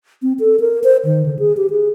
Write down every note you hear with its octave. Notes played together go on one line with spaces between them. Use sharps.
C4
A4
A#4
C5
D#3
D3
G#4
G4
G#4